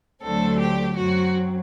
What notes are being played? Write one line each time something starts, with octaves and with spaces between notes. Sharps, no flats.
D2 D3 F#3 A3 C4 A4
G4
F#2 F#3 C4 F#4